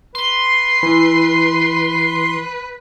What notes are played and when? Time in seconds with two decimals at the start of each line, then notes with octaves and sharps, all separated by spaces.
0.15 B4 C6
0.83 E3